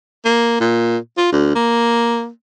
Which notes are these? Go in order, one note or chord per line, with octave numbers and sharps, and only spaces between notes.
A#3
A#2
F4
D2
A#3